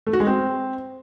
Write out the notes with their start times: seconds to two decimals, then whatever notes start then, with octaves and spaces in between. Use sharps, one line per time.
0.07 A3
0.13 F#4
0.20 G#3
0.27 C4